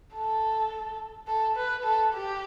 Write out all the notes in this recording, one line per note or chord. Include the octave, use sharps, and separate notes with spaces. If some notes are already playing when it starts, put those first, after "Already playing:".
A4
A4
B4
A4
G4